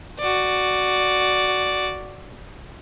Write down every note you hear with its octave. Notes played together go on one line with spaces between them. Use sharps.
F#4 D5